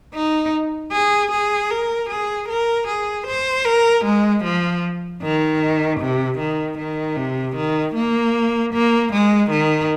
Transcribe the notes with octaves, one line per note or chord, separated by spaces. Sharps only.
D#4
G#4
G#4
A#4
G#4
A#4
G#4
C5
A#4
G#3
F3
D#3
C3
D#3
D#3
C3
D#3
A#3
A#3
G#3
D#3